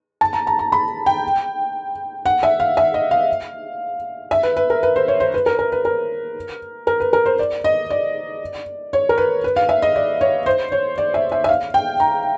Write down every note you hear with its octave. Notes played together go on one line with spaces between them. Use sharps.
A5
A#5
A#5
A#5
B5
G5
F#5
E5
F5
E5
D#5
F5
E5
B4
B4
A#4
B4
C5
C#5
C5
B4
A#4
A#4
B4
A#4
A#4
B4
A#4
C5
D5
D#5
D5
C#5
A#4
B4
B4
F5
E5
D#5
D5
C#5
C5
C#5
D5
E5
E5
E5
F5
G5
A#5